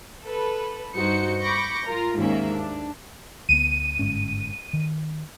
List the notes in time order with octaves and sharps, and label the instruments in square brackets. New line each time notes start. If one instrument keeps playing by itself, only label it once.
[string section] A4 B4
G2 D#4 F#4 C5 C#7
B5 C#6 D6 G6 A#6 C#7
F4 A#4 A#5
D#2 G#2 A#3 C#4 E5
D4
[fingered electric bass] D2 B3 [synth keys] D#7
[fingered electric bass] G1 G#2 C#4
D#3